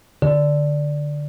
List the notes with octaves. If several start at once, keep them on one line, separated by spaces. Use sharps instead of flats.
D3